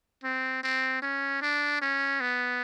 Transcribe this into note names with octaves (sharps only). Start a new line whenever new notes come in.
C4
C4
C#4
D4
C#4
B3